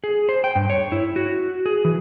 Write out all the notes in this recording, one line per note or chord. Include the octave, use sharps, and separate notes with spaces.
G#4
C5
G5
G2
C#5
E4
F#4
G#4
E3